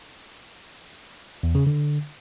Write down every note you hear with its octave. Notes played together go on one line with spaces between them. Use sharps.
E2
C#3
D3